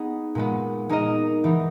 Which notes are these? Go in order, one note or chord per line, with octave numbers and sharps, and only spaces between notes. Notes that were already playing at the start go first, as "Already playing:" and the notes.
Already playing: B3 D#4 G#4
A#2 G#3 B3
G#3 D#4 A#4 D#5
E3 B3 D#4